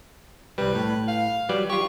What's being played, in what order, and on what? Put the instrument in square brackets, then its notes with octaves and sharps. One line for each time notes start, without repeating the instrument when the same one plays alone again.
[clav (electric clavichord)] C2 G3 [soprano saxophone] B4
[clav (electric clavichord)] A2
[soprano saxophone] F5
[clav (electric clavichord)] F#3 G3 D5 [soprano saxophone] B4
[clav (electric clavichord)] F4 G4 [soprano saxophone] C#6